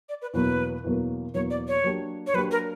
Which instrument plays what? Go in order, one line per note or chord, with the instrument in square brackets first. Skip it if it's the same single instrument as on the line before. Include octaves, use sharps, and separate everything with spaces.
[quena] D5
B4
[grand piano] E2 B2 F#3 A#3 [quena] B4
[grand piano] E2 B2 F#3 A#3
[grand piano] E2 B2 F#3 A#3 [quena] C#5
[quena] D5
C#5
[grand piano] F#3 A#3 D4 G4
[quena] C#5
[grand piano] F#3 A#3 D4 G4 [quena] B4
[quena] A#4